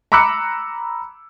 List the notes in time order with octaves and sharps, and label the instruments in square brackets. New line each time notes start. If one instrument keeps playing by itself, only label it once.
[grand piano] A#5 B5 D6 E6 F#6 C#7